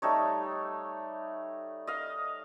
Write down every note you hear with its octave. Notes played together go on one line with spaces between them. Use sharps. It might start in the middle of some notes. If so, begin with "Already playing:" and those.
G3 A3 D#4 C#5
D#5 F5